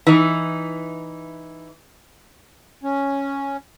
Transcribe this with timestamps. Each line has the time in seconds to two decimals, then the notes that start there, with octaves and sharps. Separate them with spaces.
0.07 E3 D#4
2.83 C#4